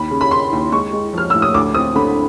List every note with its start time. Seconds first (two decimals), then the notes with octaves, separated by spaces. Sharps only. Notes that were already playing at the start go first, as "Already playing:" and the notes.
Already playing: D#2 B5
0.11 C#3
0.21 B5
0.31 C#3 C6
0.52 D#2
0.72 G#3 C#6
0.93 G#3
1.13 F3 F6
1.30 A2 E6
1.42 D#6
1.54 D2 D6
1.75 C4 D#6
1.96 D3 B5